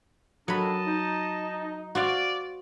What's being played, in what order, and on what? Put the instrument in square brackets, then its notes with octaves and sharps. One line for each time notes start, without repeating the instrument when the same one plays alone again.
[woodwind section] D#3 D4 A4 [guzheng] F#3 B5 [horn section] D#5 A5
[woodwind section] D#4
[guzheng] F#4 C5 F5 [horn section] D5